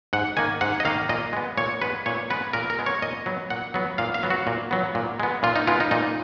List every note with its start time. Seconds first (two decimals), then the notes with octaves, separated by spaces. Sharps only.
0.13 G#2 F#5
0.37 D#3 A#3 G#5
0.61 G#2 F#5
0.80 D#5
0.85 D#3 A#3 F5
1.09 A#2 D#5
1.33 G#3 B3
1.58 A#2 C#5
1.82 G#3 B3 B4
2.06 A#2 C#5
2.30 G#3 B3 B4
2.53 A#2 A#4
2.70 A#4
2.79 G#3 B3
2.86 C#5
3.02 A#2 D#5
3.26 F#3 B3
3.50 A#2 F#5
3.74 F#3 B3
3.98 A#2 F5
4.14 F5
4.23 F#3 B3
4.30 F#4
4.47 A#2
4.71 F#3 B3
4.95 A#2
5.20 G#3 B3
5.43 A#2 F4
5.56 D#4
5.67 G#3 B3 F4
5.80 D#4
5.91 A#2 D#4